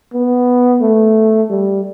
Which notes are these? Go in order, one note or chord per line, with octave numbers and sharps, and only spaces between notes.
B3
A3
G3